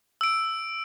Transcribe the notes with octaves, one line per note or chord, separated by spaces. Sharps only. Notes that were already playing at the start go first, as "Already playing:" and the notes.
E6 D7